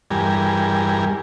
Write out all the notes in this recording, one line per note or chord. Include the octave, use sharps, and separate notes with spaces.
E2 G2 G3 A#4 G#5